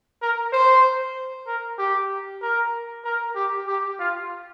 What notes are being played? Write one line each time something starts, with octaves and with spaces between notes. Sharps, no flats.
A#4
C5
A#4
G4
A#4
A#4
G4
G4
F4